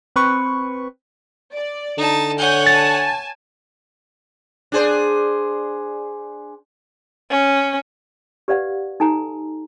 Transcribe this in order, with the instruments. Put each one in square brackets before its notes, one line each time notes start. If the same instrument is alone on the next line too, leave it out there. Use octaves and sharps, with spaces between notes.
[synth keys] C4 B4 C#6
[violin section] D5
[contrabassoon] D3 [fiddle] D#4 A5
[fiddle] C#5 F#5 [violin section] G#5 G6
[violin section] G#5 A5 [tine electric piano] A6
[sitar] D4 G#4 C5
[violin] C#4
[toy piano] G4 B4 D5 F5 F#5
D#4 A4 G#5 A#5